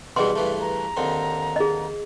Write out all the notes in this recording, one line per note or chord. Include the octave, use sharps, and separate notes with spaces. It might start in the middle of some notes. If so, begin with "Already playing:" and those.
B2 E3 G3 G#4 C6
G2 E3 A3
A#5
D#2 D3 C4
G#4 D#5